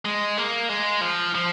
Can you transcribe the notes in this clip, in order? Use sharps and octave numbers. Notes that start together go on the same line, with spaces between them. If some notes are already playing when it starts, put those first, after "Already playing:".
G#3
A#3
G#3
F3
F3